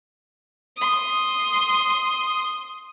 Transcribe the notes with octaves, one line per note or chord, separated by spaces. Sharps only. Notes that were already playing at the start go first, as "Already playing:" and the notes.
C6 D#6